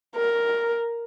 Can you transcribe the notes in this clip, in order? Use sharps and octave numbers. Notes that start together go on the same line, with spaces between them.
A#4